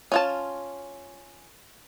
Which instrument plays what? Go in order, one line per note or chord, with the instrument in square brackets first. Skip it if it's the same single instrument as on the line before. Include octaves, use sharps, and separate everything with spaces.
[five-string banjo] C#4 F4 A5